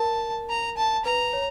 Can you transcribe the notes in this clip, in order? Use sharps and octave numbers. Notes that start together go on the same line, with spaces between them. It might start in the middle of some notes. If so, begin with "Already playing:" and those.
Already playing: A#4 A5
A#5
A5
B4 A#5
C#5